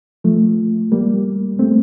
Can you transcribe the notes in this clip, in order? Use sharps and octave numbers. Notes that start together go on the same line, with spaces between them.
F3 A3
G3 A#3
A3 C4